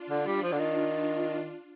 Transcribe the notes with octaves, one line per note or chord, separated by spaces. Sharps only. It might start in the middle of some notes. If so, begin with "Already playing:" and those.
Already playing: D4 F4
D3
G3
F3
D3
D#3
D4 F4